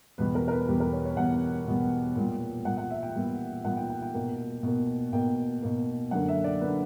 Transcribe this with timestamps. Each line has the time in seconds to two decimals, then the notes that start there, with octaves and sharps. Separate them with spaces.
0.18 E2 B2 G3 B3 B4
0.35 A#4
0.48 A#4
0.51 B4
0.68 E2 B2 G3 B3 G4
0.80 A#4
0.93 C#5
1.05 C#5
1.17 E2 B2 G3 B3 F#5
1.67 E2 B2 G3 B3
2.16 A#2 G3 B3
2.65 A#2 G3 B3 F#5
2.78 F#5
2.90 E5
3.03 G5
3.15 A#2 G3 B3
3.64 A#2 G3 B3 F#5
3.77 G5
3.90 G5
4.02 G5
4.14 B2 A#3
4.63 B2 A#3
5.13 B2 A#3 G5
5.62 B2 A#3
6.11 F#2 D3 A#3 F#5
6.29 E5
6.44 D5
6.61 D3 A#3 B4